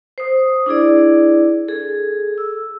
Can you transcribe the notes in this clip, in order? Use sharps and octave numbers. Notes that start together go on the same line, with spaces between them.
C5 D#6
D4 E4 G#4 D5
G#4 A4
E6